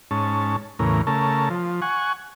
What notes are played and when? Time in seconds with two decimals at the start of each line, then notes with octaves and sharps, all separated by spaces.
0.11 G#2 C#4 A5
0.79 E2 A2 C#3 A#4
1.07 C#3 A3 A#4 A5
1.50 F3
1.82 F#5 G#5 C#6